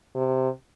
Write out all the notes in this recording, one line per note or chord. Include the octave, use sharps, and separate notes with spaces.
C3